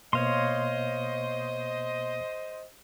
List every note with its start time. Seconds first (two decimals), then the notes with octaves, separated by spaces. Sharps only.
0.13 B2 A#3 B3 C5 C#5 D#5 F5 C6